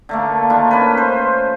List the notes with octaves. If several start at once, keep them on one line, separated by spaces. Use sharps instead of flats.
D3 A3 A#3
D#3 D4 F4
C#4 B4
C5